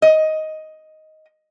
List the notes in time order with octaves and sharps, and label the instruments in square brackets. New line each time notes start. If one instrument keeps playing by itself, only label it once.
[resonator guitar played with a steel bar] D#5